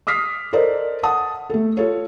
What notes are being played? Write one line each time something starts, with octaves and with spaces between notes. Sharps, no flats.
D6 D#6 F6 B6 C7
A4 A#4 C5 D5 D#5
F#5 A5 D#6
A3 A4
F4 A4 C#5